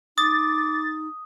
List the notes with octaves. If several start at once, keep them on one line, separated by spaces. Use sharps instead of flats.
D#4 D6 D#6 A6